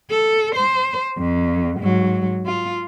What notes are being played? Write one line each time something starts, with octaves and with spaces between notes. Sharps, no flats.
A4
C5
F2
G#2 F#3
F4